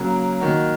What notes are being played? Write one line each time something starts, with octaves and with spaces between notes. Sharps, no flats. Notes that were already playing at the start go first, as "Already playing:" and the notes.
Already playing: C#3 F#3 A#3 F#4 A#4
D#3 A#3 F#4